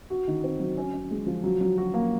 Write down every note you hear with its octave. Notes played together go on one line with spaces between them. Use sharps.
F#4
D#3
C4
F#3
C#4
C#4
G#3
F3
F#3
F#3
F#4
A#3